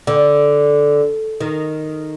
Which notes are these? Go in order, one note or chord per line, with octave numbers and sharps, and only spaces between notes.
D3
D#3